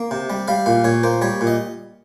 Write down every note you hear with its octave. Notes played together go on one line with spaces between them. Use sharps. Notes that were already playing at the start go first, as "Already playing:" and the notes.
Already playing: A#3
C3
G3
G3 F5
A#2 F5
A#2 C#5
A#3 C5
G3 C#5
A#2
D#5